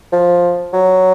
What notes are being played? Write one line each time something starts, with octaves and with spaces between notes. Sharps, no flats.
F3
F#3